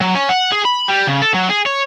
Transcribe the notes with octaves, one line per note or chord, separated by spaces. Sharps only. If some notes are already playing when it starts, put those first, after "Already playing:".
F#3
C#4
F#5
G#4
B5
G3
C#3
A4
F#3
G#4
C#5